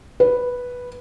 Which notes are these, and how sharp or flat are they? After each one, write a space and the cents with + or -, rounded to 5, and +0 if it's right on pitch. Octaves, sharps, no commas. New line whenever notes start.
B4 -5